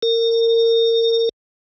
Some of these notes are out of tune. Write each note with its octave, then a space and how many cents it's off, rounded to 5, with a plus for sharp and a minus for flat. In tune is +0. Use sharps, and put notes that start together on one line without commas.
A#4 -30